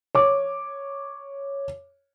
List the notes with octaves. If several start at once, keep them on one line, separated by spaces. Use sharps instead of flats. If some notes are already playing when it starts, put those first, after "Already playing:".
C#5 D6